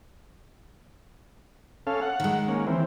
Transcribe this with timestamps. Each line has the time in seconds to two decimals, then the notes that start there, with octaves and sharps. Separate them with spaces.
1.87 C#4 A4 F5
2.02 F#5
2.20 D#3 G#3
2.48 A#3 C#4
2.67 E3 C4